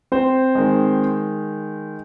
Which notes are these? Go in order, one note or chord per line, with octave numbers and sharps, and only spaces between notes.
C4 C5
D#3 G#3